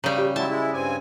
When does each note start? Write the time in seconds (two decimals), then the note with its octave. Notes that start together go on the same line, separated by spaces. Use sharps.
0.04 C#3 G3 A#5
0.17 G4 F5
0.36 F#3 G#3 E4 F#5 G5 A5
0.50 G#3 E4
0.74 G2 C4 G#5 D6